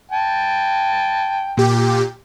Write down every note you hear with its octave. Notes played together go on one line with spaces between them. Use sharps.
G5 A5
A#2 G4